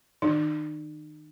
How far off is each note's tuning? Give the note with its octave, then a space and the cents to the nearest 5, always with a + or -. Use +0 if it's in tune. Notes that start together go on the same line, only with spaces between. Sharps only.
D#3 +0 D#4 -40